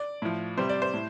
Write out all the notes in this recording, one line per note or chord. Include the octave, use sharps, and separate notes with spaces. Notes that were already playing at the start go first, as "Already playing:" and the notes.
Already playing: D5
A2 F3
C3 G3 C5
D5
C5
A2